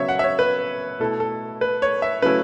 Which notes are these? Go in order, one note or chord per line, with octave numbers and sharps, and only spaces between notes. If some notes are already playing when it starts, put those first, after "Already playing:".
Already playing: C#3 F#3 B3 C#5 E5
F#5
E5
C#5
B4
B2 A3 E4 A4
A4
B4
C#5
E5
C#3 F#3 A3 C#4 E4 B4